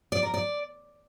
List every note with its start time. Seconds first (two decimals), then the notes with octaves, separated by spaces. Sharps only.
0.12 D5
0.23 A#4
0.34 D5